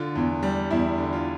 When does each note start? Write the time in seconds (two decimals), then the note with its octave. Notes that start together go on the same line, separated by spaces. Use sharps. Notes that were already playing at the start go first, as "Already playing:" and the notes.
Already playing: D3 F4
0.16 E2
0.43 G3
0.70 E2 E4
0.98 D3
1.13 F4